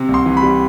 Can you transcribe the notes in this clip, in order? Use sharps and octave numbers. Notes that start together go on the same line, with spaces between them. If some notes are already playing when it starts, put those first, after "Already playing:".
Already playing: C3
C2
C6
E3
B5
G3